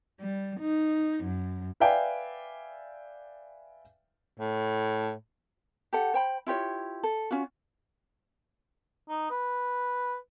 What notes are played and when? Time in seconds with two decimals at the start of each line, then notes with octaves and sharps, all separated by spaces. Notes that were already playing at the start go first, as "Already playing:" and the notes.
0.20 G3
0.60 D#4
1.24 F#2
1.80 B4 D5 E5 F5 G5 G#5
4.40 A2
5.93 G4 A4 F#5
6.14 C5 G5 B5
6.47 E4 F4 G4 C#5
7.03 A4
7.31 C#4 F4 F#4
9.09 D#4
9.30 B4